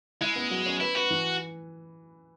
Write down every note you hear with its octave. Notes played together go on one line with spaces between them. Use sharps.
G#3 E4
B3
F#3
C#4
E4 B4
F#4 B4
E3